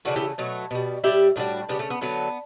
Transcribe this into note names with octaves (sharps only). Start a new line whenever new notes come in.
C#3 E3 A3 D4 F#4
E4 G4
B2 F#3 A3
B2 G3
A2 G3 E4 G4
A2 G3 D4 F#4
C#3 G3 B3 D4
A3 C#4
B3
D3 F#3 A3 B3